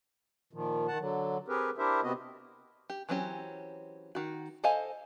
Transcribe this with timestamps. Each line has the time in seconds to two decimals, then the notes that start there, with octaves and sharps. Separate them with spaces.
0.53 A#2 D#3 F3
0.88 D#3 F#5 A5
0.99 D3 F#3
1.48 C4 G4 G#4 A#4 B4
1.78 D4 E4 G4 A#4 C5 E5
2.03 C3 B3 C4 F#4 D#5
2.90 G4
3.09 E3 F#3 C4 C#4 G4
4.15 D#3 F#4
4.64 A4 C5 D#5 F5 G#5